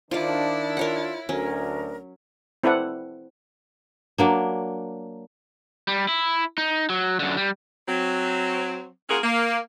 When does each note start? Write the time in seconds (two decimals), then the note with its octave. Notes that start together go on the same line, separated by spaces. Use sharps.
0.11 D#3 D4 E4 F4 C5 D5
0.77 F4 A#4 C#5 F#5
1.29 D2 F#3 C#4 A#4
2.64 C4 E4 A4 B4 D5 F#5
4.18 F#3 A#3 D4
5.88 G3
6.08 E4
6.58 D#4
6.90 F#3
7.20 F#2 D3
7.37 G3
7.88 F#3 C4
9.09 A#3 C#4 F4 F#4 G#4 A#4
9.23 A#3